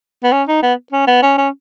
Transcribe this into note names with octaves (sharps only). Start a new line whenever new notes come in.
B3
C#4
D#4
B3
C#4
B3
C#4
C#4